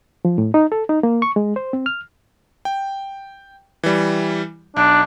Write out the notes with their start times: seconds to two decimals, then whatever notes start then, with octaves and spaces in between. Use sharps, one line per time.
0.25 F3
0.38 A2
0.54 D#4
0.72 A4
0.89 D#4
1.03 A#3
1.22 C#6
1.36 G#3
1.56 C5
1.73 C4
1.86 F6
2.65 G5
3.83 E3 G3
4.76 B1 D4